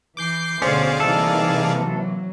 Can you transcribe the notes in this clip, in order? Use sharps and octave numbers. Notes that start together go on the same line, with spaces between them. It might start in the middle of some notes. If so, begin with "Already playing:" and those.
E3 D6 G6 C7
D2 B2 D3 C#4 G#4 C5 D5 F5
C3 E3 G3 A#3 D#4 A4
F#3